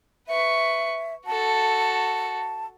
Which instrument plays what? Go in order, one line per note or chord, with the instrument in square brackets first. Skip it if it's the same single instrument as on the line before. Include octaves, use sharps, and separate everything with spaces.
[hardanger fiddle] B4 C#6 [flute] E5
[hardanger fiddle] F#4 A4 [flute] A5